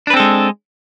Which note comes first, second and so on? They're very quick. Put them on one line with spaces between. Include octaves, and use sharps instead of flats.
D4 B4 C4 A4 G#3